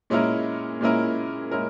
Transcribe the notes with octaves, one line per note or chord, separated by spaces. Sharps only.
A#2 G#3 C#4 E4 A#4
A#2 G#3 C#4 E4 A#4
A#2 G#3 C#4 E4 A#4